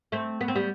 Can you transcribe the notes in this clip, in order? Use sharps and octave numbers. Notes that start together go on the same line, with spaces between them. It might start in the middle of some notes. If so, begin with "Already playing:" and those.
A3 C4
B3
C4
G3 B3